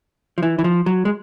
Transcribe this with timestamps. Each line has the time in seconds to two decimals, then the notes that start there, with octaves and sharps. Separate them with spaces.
0.38 F3
0.43 E3
0.59 E3
0.64 F3
0.86 F#3
1.05 G#3